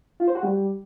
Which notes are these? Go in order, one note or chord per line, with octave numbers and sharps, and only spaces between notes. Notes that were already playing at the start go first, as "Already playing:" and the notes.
F4
C5
F#4
G3